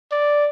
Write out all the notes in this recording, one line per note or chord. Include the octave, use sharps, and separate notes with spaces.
D5